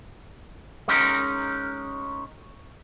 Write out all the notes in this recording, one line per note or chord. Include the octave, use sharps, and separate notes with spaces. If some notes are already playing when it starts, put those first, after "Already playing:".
G#3 C#4 D#4 A#4